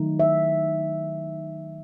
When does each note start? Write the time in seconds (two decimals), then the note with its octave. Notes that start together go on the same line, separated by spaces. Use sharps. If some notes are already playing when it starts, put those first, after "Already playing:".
Already playing: D#3 F#3 A3 D#4
0.20 E5